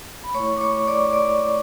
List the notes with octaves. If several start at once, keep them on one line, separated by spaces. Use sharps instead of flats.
B5
A3 E4 C#5 C#6
D6
C#5 C#6
D5 D6
D5 D6